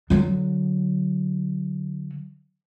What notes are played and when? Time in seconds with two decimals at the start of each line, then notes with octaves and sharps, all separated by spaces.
0.10 D3 F#3